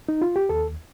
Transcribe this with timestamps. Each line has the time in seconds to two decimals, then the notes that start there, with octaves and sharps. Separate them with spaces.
0.09 D#4
0.22 F4
0.36 G4
0.49 D#2 A4